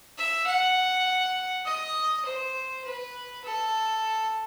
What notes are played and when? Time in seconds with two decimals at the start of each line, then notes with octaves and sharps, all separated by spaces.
0.18 E5
0.47 F#5
1.65 D#5
2.25 C5
2.85 B4
3.44 A4